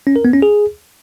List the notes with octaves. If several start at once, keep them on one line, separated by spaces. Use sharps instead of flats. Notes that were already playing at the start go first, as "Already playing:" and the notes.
C#4
A#4
B3
C#4
G#4